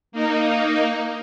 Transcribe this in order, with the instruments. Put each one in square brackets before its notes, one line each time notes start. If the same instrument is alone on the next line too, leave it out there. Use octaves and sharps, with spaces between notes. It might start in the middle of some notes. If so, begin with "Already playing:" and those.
[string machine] A#3 D#4